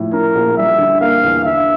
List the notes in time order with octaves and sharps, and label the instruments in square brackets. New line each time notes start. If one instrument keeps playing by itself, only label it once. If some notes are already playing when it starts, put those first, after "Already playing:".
Already playing: [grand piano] A2 F3
[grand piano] C#4 [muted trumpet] A#4
[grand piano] A#1
[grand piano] G3 [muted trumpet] E5
[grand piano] D3
[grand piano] A#3 [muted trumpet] F5
[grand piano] E2
[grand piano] D3 [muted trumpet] E5